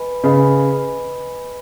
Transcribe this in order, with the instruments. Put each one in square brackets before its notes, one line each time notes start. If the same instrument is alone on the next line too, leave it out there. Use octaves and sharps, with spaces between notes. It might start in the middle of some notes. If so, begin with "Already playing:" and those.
Already playing: [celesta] B4 D#5 G#5 B5
[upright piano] C#3 [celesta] B4 D#5 G#5 B5